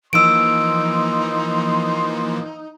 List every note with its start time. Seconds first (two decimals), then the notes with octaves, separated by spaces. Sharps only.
0.13 E3 F3 A#3 D#4 C6 E6 D7